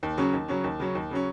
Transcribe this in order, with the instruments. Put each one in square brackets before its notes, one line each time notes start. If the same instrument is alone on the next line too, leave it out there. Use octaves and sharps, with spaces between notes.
[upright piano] D#2
C#3 F#3 C#4
D#2
C#3 F#3 C#4
D#2
C#3 F#3 C#4
D#2
C#3 F#3 C#4